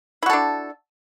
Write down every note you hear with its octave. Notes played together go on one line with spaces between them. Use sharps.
D4 E4 F#4 A4